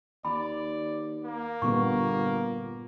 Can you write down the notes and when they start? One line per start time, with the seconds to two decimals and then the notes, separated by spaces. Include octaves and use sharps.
0.25 D#2 D5 B5
1.24 A#3
1.62 G1 A#2 B3 C#6